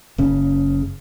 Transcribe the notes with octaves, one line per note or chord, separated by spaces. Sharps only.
F#1 C#3